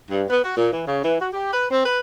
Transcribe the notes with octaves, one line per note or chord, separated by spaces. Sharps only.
G2
B3
F#4
A#2
E3
C#3
E3
F#4
G4
B4
C4
B4